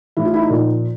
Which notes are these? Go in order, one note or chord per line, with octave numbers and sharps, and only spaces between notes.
A2 E3 E4
F4
E4
D#4
A#2 F3